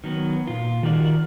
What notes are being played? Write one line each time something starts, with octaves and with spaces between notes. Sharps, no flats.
D#3 F#3 B3
A#2 F4
D#3 D#4 F#4 G4 A#4 D5